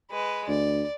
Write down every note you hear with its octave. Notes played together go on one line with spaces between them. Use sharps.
G#3 B4
D2 D5